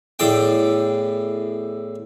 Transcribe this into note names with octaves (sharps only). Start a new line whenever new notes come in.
E2 A2 D5 G5